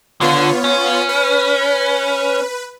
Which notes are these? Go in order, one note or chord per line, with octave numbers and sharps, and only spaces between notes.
D3 B3 F4 C#5
C#4
B4